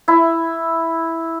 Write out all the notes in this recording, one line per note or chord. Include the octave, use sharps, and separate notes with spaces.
E4